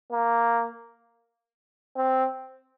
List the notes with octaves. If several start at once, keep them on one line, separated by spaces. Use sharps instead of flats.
A#3
C4